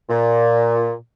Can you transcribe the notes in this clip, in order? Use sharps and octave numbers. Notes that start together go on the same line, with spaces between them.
A#2